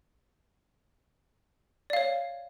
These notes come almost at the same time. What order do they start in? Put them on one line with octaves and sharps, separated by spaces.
D5 F5 C#5